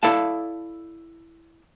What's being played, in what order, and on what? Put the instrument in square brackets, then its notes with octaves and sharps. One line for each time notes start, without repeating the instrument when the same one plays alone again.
[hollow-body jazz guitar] E4 A4 D5 F5 A5